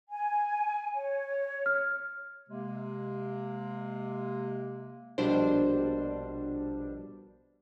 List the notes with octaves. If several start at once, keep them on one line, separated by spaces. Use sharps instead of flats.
G#5
C#5
F6
C3 G#3 A#3
A#1 B2 G3 D4 C5